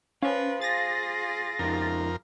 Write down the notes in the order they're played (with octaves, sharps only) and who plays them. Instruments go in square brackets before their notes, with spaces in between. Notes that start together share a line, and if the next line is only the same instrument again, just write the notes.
[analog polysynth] C#4 [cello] B4 [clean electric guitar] C5 F5
[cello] F4 G#4 [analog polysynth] A6 A#6
[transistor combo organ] F2 A#4 [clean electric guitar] C#3 F3